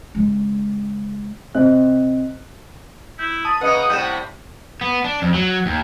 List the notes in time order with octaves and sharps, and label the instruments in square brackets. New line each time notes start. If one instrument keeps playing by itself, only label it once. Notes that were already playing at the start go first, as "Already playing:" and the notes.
[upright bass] C#3 G#3
[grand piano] C3 C4 D#5 F#6
[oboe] E4 [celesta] G6
[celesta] A5 A6 F#7 [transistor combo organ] D#6
[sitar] C#3 A#3 [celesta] B4 D#5 C#7 [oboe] F#5
[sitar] A2 C3 G3 [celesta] G6 D#7 E7
[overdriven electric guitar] B3
D4
F2
F#3
D#2